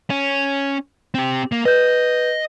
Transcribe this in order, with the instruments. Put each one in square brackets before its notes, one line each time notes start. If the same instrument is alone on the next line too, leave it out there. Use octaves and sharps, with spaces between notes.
[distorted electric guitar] C#4
C4 G4
A#3
[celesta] B4 G6 [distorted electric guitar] D#5